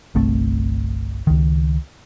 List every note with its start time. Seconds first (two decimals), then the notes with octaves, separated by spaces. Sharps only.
0.15 G1 C2 A3 C4
1.27 C#2 D#3